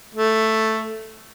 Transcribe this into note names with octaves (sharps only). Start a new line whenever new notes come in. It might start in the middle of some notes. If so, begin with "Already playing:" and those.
A3